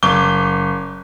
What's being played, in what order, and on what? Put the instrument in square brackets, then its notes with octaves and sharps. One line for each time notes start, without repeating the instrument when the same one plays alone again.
[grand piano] F#1 D6 G7